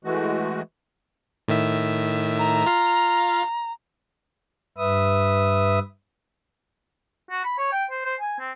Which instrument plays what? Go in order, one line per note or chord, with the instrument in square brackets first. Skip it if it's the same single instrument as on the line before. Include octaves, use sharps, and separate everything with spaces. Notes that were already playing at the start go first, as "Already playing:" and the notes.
[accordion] E3 G#3 A3 F#4
[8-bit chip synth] A2 D#3 E5
[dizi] A#5
[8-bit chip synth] F4 F5
[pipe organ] G2 B4 E5 D#6
[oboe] F#4
B5
C#5
G5
C5
C5
G#5
C4